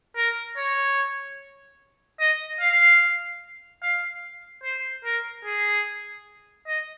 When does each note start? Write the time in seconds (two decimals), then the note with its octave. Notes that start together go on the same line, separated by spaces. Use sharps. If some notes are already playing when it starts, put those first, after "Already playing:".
0.17 A#4
0.57 C#5
2.20 D#5
2.61 F5
3.82 F5
4.63 C5
5.05 A#4
5.45 G#4
6.67 D#5